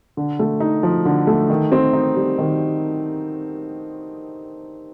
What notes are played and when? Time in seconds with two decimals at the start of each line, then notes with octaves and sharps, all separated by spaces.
0.17 D3
0.39 A3
0.60 D#4
0.83 F3
1.05 D3
1.27 A3
1.50 D#3
1.72 C4
1.93 D#4
2.16 G3
2.38 D#3